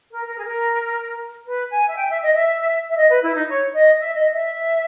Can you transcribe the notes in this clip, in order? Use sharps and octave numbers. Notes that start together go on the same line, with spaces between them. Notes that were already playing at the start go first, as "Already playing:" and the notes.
A#4
A#4
G#4
A#4
B4
G#5
E5
G5
E5
D#5
E5
E5
D#5
B4
E4
D#4
C#5
D#5
E5
D#5
E5